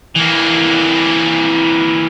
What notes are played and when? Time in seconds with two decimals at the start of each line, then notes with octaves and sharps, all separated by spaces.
0.16 E3 A#3